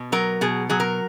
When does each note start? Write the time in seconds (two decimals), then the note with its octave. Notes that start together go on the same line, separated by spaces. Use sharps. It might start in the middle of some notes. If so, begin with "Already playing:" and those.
Already playing: B2
0.12 F#3 A#4
0.41 B2 G#4
0.70 F#3 G#4
0.80 A#4